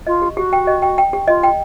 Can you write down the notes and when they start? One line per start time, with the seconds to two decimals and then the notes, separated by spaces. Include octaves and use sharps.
0.07 F4 D#5
0.22 G4
0.37 F#4 G4
0.53 G5
0.67 D#5
0.82 G5
0.98 G5
1.13 G4
1.28 F4 D#5
1.43 G5